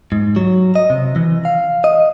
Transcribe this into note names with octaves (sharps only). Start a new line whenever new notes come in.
G#2
F#3
D#5
C3
E3
F5
D#5